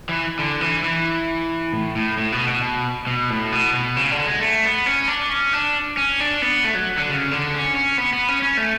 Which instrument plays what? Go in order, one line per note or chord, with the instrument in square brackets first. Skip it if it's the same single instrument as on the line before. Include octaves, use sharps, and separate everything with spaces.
[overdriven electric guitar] E3
D3
E3
E3
A2
A2
A2
B2
B2
B2
B2
A2
B2
B2
C#3
D3
G#3
A3
B3
C#4
D4
C#4
D4
C#4
D4
B3
A3
F#3
D3
C#3
D3
C#4
C#4
B3
B3
C#4
C#4
A3